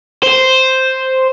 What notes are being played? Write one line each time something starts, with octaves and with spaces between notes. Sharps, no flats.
C5